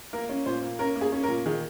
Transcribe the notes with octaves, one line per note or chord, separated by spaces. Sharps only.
A#3 A#4
C#4
A#2 C5
A#3
C#4 A#4
A#3
G#4
C#4
A#4
A#2
D#3 G#4